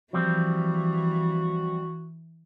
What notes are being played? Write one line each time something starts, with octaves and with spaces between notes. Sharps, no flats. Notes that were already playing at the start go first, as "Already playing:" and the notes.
E3 F3 G3 C4 F#4